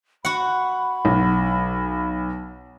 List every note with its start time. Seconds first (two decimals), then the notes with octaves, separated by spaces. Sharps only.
0.25 F#4 F#5 B5
1.05 B1